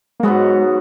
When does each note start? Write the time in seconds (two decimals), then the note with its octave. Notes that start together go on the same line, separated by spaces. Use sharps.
0.20 A#3
0.23 G#2 F#3 G#3 B3 F#4